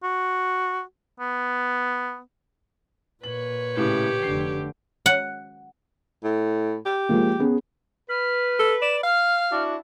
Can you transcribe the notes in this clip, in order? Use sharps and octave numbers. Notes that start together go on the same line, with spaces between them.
F#4
B3
A#2 B4 C#5 F#7
A2 C#3 G4
F1 D3 C7
F#5
A2
G4
F3 G#3 A#3
B3 C#4 G#4
B4 F6
A4
D5 E7
F5 F6
D4 E4 F#4